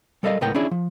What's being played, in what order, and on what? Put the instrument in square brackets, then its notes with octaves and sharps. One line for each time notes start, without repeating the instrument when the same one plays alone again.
[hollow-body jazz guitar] G3 A4 A#4 D#5 F5
C#2 A2 B3 A#4 G5
C#4 D4 E4 G#4
F3